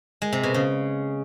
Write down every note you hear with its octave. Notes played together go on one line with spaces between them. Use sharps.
G#3
C3
B2
C#3